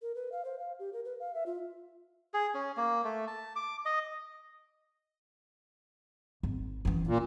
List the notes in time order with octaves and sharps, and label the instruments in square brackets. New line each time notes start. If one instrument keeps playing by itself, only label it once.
[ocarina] A#4
B4
F5
C5
F5
G4
A#4
B4
F5
E5
F4
[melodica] G#4
C#4
A#3
A3
A5
D6
D#5
[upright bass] G#1
E3 C#4
[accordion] A#2